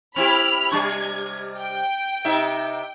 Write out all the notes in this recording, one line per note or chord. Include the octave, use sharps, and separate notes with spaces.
C4 E4 G4 B5 F6
C3 G3 D4 G#6
G5
C3 D#4 E5